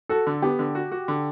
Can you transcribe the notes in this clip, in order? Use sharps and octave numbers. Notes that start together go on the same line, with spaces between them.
F#4 A4
D3
B3 G4
D3
F#4
F#4
D3